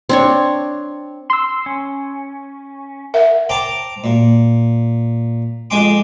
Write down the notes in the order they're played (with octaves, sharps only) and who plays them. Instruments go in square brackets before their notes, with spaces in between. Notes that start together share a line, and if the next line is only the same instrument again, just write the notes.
[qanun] C4 D4 C#5
[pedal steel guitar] C6 E6
C#4
[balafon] A#4 E5 F#5
[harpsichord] C5 G5 A5 A#5 D6
A#2
F2 G#3 G5 G#5 C6 D6